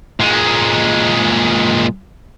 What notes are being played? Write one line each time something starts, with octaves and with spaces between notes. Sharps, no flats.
A#2 G#3